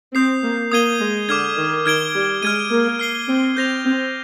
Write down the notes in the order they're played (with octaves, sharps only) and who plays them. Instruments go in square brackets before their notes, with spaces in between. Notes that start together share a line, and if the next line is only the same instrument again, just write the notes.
[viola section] C4 [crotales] D#6 G6 C7
[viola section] A#3
[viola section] A#3 [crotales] D#6 G#6 D#7 G7
[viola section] G#3
[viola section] D3 [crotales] D6 F6 G#6
[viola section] D#3
[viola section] D#3 [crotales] F6 G#6 D7 G7
[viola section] G3
[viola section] G#3 [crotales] F6 G#6 D#7
[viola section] A#3
[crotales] F6 C7 G7
[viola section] C4
[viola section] C4 [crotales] G6 A#6 F7
[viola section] C4